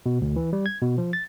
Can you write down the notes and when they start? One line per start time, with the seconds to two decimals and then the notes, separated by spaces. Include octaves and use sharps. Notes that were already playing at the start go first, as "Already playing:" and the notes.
0.06 B2
0.21 D2
0.36 E3
0.53 G3
0.66 G#6
0.82 B2
0.98 F3
1.13 A6